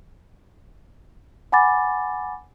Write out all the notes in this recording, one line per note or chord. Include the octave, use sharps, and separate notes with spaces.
F#5 G#5 B5 D6 A6